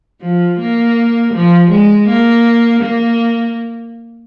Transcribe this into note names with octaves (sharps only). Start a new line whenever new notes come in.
F3
A#3
F3
G#3
A#3
A#3